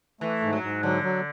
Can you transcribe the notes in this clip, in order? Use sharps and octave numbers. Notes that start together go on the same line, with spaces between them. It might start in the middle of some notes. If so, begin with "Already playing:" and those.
E3 A3
G#2
F#3
G#2
D3 F#3
F#3